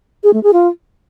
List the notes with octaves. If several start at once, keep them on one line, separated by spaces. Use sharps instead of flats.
G#4
A3
G#4
F4